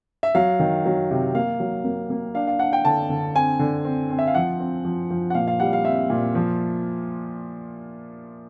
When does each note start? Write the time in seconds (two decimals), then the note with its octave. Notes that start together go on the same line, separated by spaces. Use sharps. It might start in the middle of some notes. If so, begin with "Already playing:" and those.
0.23 E5
0.35 F#3 F5
0.59 D#3
0.86 F#3
1.11 C3
1.35 A#3 F5
1.60 F#3
1.84 A#3
2.10 A#3
2.34 D4 F5
2.47 F5
2.59 D4 F#5
2.73 G5
2.85 D3 A5
3.09 D3
3.35 C4 G#5
3.59 D3
3.85 C4
4.10 C4
4.19 E5
4.27 F5
4.35 F3 F#5
4.60 C4
4.85 F3
5.11 F3
5.30 F#5
5.35 A#2 F5
5.48 F5
5.60 G3 F#5
5.73 F5
5.84 C4 E5
6.10 A#2
6.35 F3